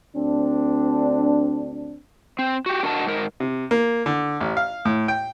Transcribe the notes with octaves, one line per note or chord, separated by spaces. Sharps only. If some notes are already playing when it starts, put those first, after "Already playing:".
D2 C4 D4
C4
F#4 G4
D4 F#4 A#4 D#5 F#5 A5
G#2 A#4
C3
A#3
D3
A1
F5
A2
G5